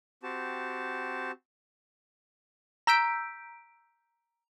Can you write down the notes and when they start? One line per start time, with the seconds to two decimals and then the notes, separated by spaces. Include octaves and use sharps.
0.23 C4 F#4 G4 A5
2.87 A#5 E6 G6 B6 D7